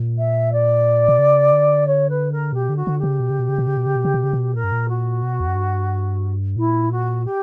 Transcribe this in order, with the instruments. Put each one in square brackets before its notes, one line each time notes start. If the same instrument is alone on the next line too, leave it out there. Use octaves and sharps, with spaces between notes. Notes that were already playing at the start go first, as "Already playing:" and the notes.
Already playing: [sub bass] A#2
[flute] E5
D5
[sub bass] B2
C#3
D3
[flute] C#5
B4
A#4
[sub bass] B2 [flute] G4
[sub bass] D3
[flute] F#4
[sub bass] D3
[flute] G4
[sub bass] C#3
B2
C#3
B2
C#3
B2
C#3
B2
C#3
B2
C#3
B2
C#3
B2
[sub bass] A#2 [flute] A#4
[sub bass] G2
A#2
[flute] F#4
[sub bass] B2
E2
F#2
G2
[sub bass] A#2 [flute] E4
[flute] F#4
G4